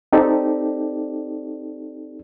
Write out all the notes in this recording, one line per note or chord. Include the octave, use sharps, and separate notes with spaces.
C4 D#4 G4 A4 D5